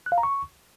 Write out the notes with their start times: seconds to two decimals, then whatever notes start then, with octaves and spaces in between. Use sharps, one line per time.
0.06 F#6
0.12 F5
0.18 A#5
0.23 C#6